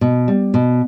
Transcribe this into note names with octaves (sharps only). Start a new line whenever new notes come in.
B2
G3
B2